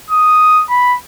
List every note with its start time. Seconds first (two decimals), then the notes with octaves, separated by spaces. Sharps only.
0.10 D#6
0.70 B5